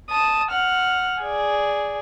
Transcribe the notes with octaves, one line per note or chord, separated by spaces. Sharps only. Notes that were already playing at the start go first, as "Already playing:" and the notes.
A5 D#6
F#5 F6
G#4 D5